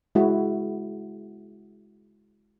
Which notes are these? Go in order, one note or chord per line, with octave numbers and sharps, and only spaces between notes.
G#3 E4 F#4